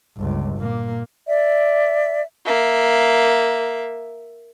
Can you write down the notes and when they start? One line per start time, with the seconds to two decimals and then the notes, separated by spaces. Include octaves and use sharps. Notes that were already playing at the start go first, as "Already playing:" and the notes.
0.17 G1 C#2
0.57 A#2 A#3
1.27 D5 E5
2.45 A#3 E5